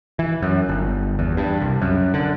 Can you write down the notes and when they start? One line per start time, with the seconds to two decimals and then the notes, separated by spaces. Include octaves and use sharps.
0.19 E3
0.42 F#2
0.69 G1
1.19 E2
1.37 G2
1.61 C2
1.82 F#2
2.14 D3